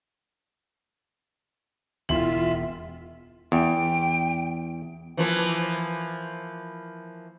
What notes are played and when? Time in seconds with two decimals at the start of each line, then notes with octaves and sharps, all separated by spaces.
2.09 E1 E4 F4 E5 C6 F#7
3.52 E2 G5
5.17 E3 F3 A#3